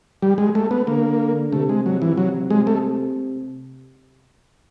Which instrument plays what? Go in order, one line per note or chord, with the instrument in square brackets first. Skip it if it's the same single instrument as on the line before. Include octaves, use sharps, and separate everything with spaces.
[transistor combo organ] G3
G#3
A3
B3
[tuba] D3 [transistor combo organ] A#3
[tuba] C3 [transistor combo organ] A3
[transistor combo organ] G#3
F#3
E3
F#3
G#3
A3